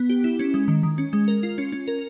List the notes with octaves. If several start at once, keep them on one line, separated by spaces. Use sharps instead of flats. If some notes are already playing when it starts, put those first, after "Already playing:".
Already playing: B3
G4
E4
C#4
G#3
D#3
D#3
C#4
G#3
A#4
F4
C#4
C#4
A#4